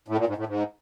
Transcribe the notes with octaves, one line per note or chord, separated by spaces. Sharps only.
A2
A#2
G#2
A2
G#2